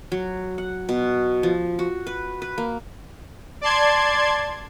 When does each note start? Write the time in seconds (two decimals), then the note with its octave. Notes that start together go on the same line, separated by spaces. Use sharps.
0.12 F#3
0.58 F#5
0.89 B2
1.43 F3
1.79 F#4
2.07 B4
2.42 B4
2.58 A#3
3.61 D5 A5 C6 G#6